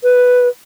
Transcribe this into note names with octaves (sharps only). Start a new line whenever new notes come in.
B4